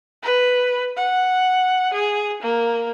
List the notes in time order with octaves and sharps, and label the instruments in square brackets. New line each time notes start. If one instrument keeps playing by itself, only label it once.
[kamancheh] B4
F#5
G#4
A#3